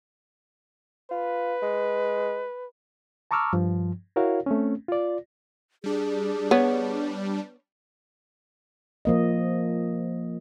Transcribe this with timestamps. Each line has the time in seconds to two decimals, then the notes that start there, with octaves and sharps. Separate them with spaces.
1.11 F4 B4
1.62 G#3
3.31 A5 A#5 C#6 D6 E6 F6
3.53 G2 F3
4.16 E4 F#4 A#4 C#5 F5
4.46 A3 C4 C#4
4.88 F4 D5
5.84 G3 D4 G#4
6.51 B3 C#5
9.05 F3 A#3 D#5